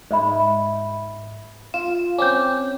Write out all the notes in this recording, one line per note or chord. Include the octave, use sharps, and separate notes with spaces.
G#2 D#5 E5 B5
F4 E7
C4 C#4 D6 G6